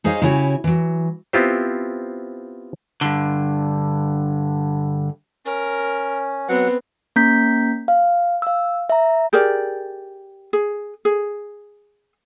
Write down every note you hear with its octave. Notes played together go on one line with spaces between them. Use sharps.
D#4 G#4 C5 C#5 D#5 F5
C#3 E4 F#4 G4 C#5 G#5
E3 F#3
B3 C4 E4 F4 G4 C5
G2 D3
C#4 A#4
F#3 B3 C4 B4 F#5
A#3 C#4 A#5 G6 B6
F5
F5 E6
E5 A#5
G4 G#4 A#4 D5
G#4
G#4